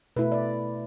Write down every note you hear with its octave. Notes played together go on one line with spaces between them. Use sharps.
B2 A3 E4 B4
D5